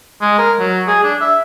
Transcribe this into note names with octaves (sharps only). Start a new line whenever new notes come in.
G#3
A#4
F#3
G#4
D4
E5